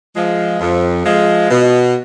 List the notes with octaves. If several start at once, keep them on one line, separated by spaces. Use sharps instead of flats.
F3 G#3
F2
F3 G#3
B2